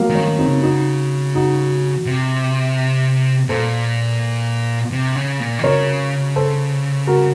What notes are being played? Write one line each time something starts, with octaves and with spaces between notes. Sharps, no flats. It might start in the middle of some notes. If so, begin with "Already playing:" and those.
Already playing: F3 F#3 A3 A#3
D#3
A#3 C#4
D#3
C4 D#4
C#3
D#4 F#4
D#4 F#4
C3
A#2 A4 C5
C3
C#3
A#2
D#3
C#3 A#4 C#5
A4 C5
F#4 A#4